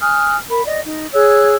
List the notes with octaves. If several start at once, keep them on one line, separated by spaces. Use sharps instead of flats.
G#5 D#6 F6 F#6
A#4 B5
D5 D#5
D#4
G#4 C#5 E6 F#6